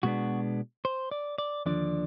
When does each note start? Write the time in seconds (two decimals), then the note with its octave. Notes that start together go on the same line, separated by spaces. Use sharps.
0.03 B2 G#3 B3 D4 F#4
0.85 C5
1.11 D5
1.38 D5
1.66 D#2 D3 F3 D4 D5